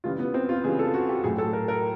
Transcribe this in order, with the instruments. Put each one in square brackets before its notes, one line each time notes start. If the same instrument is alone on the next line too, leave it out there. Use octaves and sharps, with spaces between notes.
[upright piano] C#3 E3 G3 F4
B3
C4
F4
C#3 E3 G3 G#4
A4
F#4
G4
A2 F#3 G#4
A4
A#4
A#4